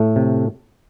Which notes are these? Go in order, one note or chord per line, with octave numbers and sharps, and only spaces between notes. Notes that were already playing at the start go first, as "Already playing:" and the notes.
Already playing: A2 A3
C3